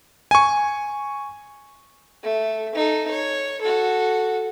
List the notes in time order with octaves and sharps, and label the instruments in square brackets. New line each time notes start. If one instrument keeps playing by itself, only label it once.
[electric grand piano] G#5 C#6
[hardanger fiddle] A3
D#4 A4
C#5
F#4 A4